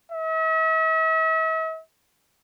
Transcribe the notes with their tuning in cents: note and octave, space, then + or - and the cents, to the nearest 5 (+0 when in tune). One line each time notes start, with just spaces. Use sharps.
E5 -45